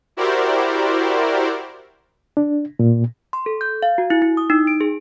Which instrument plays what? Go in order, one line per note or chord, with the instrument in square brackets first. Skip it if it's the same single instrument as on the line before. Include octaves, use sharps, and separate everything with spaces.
[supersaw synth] E4 F#4 G4 A#4 C5 D5
[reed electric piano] D4
A#2
[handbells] C6
A4
G6
F5
F#4
E4
E4
D#6
D#4
D7
G#4